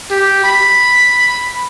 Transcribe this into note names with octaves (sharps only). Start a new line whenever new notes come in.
G4
B5